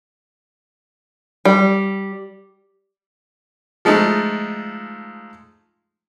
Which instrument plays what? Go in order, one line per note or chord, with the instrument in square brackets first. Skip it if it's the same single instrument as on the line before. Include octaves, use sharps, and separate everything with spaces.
[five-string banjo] G3
[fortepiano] F3 G#3 A3 D#4